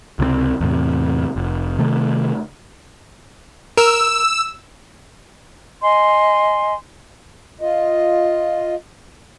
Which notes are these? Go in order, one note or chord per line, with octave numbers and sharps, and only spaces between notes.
C#2 C3 G3 C4
E2 A2 C3
F1
C3 D#3 A3
A#4 E6
D#5 G#5 C6
F4 D#5